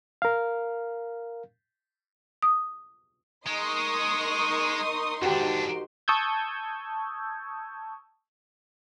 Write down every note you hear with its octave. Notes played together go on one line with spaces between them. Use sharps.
A#4 F5
D#6
G#3 D#4 A#4 C6 C#6 D#6
F2 G#2 D#3 D4 F#4 G4
A5 C#6 D#6 E6 G6 G#6